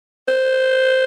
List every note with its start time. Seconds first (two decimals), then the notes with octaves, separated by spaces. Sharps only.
0.28 C5